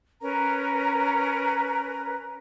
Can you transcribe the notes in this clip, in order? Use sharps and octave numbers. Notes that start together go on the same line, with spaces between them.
C#4 A#4 B4 A#5